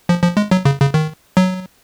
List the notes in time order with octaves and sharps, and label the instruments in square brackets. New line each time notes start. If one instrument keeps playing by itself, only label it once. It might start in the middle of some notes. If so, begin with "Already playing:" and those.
[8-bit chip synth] F3
F3
G#3
F#3
C#3
C#3
D#3
F#3